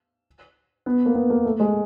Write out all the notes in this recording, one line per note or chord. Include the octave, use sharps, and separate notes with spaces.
B3
A#3
B3
A#3
A3
G#3